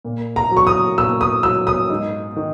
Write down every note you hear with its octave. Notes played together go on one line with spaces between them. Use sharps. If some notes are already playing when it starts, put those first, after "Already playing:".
A#2
A#5
F#3
C#6
D#6
A#2 E6
D#6
F#3 E6
D#6
G#2
D#3